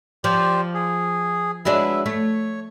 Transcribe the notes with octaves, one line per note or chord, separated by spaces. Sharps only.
F3 G4 C5 D5
G#4
F#3 G#3 D4 E4 B4 E5
A3 C#5